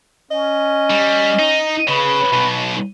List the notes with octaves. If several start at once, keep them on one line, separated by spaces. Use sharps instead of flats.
C#4 D#5
G3
D#4
C#3 B4
B1 B2